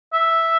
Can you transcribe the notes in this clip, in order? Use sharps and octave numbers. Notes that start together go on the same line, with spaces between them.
E5